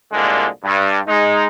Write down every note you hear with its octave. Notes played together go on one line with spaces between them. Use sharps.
C2 A#2 D3 G#3
G2
G#3 D#4